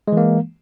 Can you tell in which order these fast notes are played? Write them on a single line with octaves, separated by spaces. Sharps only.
G#3 E3 A#3